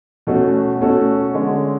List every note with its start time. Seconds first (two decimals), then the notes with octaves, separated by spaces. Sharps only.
0.27 B2 A3 C#4 F#4 A4
0.81 B2 A3 C#4 F#4 A4
1.34 D3 G#3 C#4